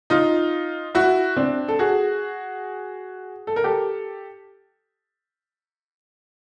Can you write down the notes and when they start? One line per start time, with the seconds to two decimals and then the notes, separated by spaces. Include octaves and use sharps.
0.10 D#4 F4
0.95 E4 F#4
1.37 C4 D4
1.68 A4
1.79 F#4 G#4
3.47 A4
3.56 A#4
3.64 G4 A4